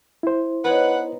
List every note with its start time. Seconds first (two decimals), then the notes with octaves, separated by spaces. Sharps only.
0.23 E4 C5
0.64 B3 D#4 B4 C#5 F#5